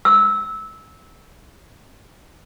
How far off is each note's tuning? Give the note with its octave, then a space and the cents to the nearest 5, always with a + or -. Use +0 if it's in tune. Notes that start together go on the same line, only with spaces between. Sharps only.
E6 -15